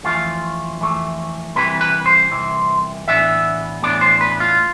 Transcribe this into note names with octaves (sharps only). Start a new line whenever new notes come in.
F2 E3 A3 F4
F2 E3 A3
C2 C3 E3 B4
B4
C5
C2 C3 E3
A2 E3 B3 D4 E5
A2 E3 B3 D4 D5
C5
B4
F4